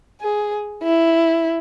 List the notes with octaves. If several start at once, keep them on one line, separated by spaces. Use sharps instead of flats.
G#4
E4